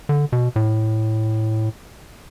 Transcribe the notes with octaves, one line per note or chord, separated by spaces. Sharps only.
D3
B2
A2